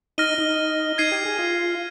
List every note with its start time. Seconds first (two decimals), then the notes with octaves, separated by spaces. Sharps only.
0.18 D#4 F6 A#6 D#7 G7
0.38 D#4
0.98 D#4 G#6 C7 D#7
1.12 G4
1.25 G#4
1.39 F4